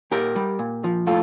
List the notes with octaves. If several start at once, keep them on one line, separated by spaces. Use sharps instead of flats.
A#2 G4 A#4
G3
A#2
F3
A2 F4 A4